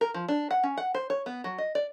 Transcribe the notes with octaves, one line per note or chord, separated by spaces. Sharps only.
A#4
F3
D4
F#5
C#4
F#5
C5
C#5
B3
F#3
D#5
D5